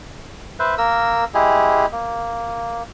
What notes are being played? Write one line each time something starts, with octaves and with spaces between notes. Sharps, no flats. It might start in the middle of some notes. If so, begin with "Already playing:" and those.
B4 C5 E5
A#3 A#4 E6
G#3 E4 G4 G#4
A#3